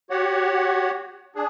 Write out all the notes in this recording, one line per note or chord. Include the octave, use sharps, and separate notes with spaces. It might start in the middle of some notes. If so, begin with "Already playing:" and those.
F#4 G4 C#5 F#5
D4 G#4